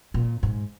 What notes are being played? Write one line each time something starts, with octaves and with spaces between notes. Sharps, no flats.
A#2
G#2